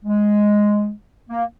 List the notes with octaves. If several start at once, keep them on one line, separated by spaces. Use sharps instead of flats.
G#3
A#3